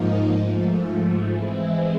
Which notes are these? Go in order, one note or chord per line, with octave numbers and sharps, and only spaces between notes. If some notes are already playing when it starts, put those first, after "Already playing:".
Already playing: G#2 F3 A#3 D#4
G#2 F3 A3
E3 G#3 C4 E4